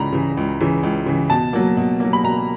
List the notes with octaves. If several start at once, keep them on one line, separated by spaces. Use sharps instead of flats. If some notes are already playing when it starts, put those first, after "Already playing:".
Already playing: C#2 C#3 E3 A#5 B5
C#3 E3
C#2
C#3 E3
C#2
C#3 E3
B2 A5
F#3 A#3
B2
F#3 A#3
B5
B2 A#5